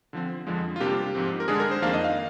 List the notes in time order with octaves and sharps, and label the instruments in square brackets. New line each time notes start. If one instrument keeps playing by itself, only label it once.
[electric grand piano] D3 F3 C4
F2 D3 F3 G#3
F4
C3 G3 A#3 D4 G4
G#2 F3 C4
A#4
D3 G#3 D4 G#4
A#4
C5
F2 D#3 A#3 D4 F5
D#5
F5